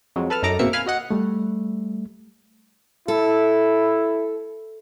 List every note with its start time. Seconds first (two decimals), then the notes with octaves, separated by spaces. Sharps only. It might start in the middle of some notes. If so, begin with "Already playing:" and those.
0.16 F2 F#3 G#3
0.30 A4 B4 A5 F6
0.43 F#2 D#4 A4 A#5 D6
0.59 G#1 B2 A#3 C4 E5 C#7
0.73 F5 G#5 B5 F6
0.86 F#4 D#5 F#5
1.11 G3 A3
3.08 E4 A4